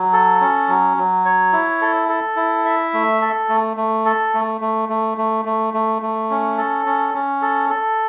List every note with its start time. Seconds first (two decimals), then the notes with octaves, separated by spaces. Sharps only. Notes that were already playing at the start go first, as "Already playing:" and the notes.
Already playing: F#3
0.13 A4
0.41 C#4
0.68 F#3
0.97 F#3
1.25 C#5
1.53 E4
1.81 A4
2.09 A4
2.37 E4
2.65 E5
2.94 A3
3.21 A4
3.49 A3
3.77 A3
4.05 A4
4.34 A3
4.61 A3
4.89 A3
5.18 A3
5.45 A3
5.74 A3
6.02 A3
6.30 C#4
6.57 A4
6.86 C#4
7.14 C#4
7.42 A4
7.70 A4